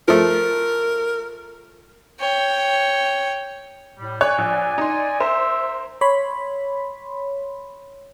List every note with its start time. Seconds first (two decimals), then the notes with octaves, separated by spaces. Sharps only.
0.08 F3 A3 A#4
2.20 C#5 G5
3.99 A2 G3
4.21 C#5 D5 G#5 F#6
4.38 A#1
4.78 D#4 C6
5.20 A#4 C5 E5
6.01 C#5 B5 C6